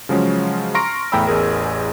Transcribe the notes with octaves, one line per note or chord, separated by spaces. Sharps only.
C#3 F3 F#3 G#3 C#4
A#5 C6 C#6 F6 A#6 D7
E2 A2 G5 A#5 B5 E6
A1 E2 G#4 A#4